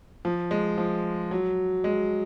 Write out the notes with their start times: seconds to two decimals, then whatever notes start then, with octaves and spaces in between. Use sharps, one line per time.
0.25 F3
0.51 G#3
0.78 F3
1.31 F#3
1.84 G#3